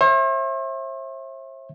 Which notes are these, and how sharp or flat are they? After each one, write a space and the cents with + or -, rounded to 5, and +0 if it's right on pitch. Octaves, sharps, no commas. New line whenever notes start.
C5 +45 E5 +0